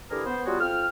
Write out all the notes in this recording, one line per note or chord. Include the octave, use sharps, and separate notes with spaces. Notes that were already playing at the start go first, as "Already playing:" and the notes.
D3 E3 E4 G4 G#4 A#4
B3 C5
F#3 G3 B3 F4 F#4 G#4
F2 F4 G5 F6